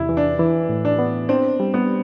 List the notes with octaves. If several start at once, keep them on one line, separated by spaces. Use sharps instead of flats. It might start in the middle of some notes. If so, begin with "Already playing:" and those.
Already playing: E2 C3 E4
E3
D4
E3
A2
D4
B3
C4 D4
G3
B3